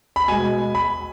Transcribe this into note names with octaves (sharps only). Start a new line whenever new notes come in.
B5
B2 G#3 G#5
B5